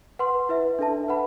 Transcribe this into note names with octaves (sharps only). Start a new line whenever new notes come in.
B4 F#5 C6
E4 B4 E5
D4 A4 E5 A5
B4 F#5 B5